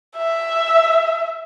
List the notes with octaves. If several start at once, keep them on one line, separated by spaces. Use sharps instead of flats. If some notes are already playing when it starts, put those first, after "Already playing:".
E5